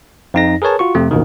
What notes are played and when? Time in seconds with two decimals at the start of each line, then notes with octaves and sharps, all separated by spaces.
0.34 F2 D#4 A#6
0.62 G#4 A#4 B4 C#5 A5
0.79 F4 F#4 C#6
0.95 F2 C3 A3
1.11 A1 D#2 B2 D#3